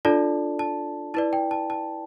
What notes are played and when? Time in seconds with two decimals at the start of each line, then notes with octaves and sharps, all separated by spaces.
0.05 D4 F4 A4 D5 A5
0.59 A5
1.14 E4 B4 D5 A5
1.33 G5
1.51 A5
1.70 A5